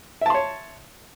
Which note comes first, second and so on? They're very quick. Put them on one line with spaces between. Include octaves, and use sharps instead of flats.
E5 A5 C6 C#5